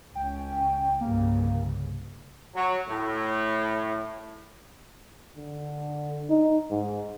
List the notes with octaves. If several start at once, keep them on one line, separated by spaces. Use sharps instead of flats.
C#2 C#4 G5
C2 G2 C#3 A#3
F#3
A2
D3
D#4
G#2